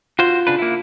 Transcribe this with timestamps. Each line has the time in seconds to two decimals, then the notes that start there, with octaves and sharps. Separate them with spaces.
0.19 F4 F#4 C5
0.47 C#3 D4 B4
0.59 A#3 E4